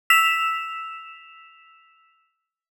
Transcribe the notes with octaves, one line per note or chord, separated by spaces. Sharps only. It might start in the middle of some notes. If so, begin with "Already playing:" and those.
E6 B6 E7 F7